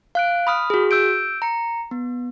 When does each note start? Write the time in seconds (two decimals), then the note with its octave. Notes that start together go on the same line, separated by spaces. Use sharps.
0.15 F5 F#6 D7
0.47 B5 D#6 F6
0.70 F#4 G#4
0.91 E6 G6 D7
1.42 A#5 C#7
1.91 B3